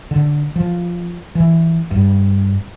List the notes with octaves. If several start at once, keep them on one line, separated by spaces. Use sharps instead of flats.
D3
F3
E3
G2